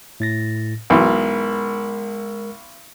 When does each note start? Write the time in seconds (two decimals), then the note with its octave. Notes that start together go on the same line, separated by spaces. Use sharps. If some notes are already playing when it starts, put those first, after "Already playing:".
0.20 A2 A6 A#6
0.90 B1 E3 G#3 A#4